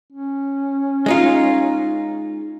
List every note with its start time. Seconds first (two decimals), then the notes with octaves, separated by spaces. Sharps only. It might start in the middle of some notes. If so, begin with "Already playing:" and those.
0.12 C#4
1.06 G#3 D#4 F4